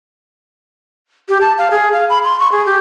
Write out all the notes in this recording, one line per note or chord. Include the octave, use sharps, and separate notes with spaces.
G4
A5
F5
G#4
F5
B5
C6
C#6
G#4
G4